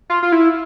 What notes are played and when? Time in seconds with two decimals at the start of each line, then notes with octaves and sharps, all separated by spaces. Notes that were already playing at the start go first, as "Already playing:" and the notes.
0.10 F4
0.23 F4
0.32 E4